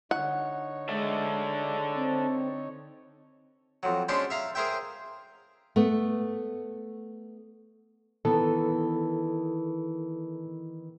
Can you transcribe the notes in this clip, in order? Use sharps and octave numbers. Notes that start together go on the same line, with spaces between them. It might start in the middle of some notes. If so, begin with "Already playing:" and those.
D3 D#4 C#5 F#5
G#3 A4 D5 E5
C4
F2 F#3
G#3 C#4 D4 C5 A5 B5
E5 F5 A#5
G#4 A#4 C5 E5 G5
A3 B3
D#3 E3 B3 A4 A5